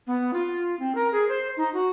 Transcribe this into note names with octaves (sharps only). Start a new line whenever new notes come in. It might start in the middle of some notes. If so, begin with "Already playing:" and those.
B3
F4
C4
A#4
G#4
C5
D#4
F#4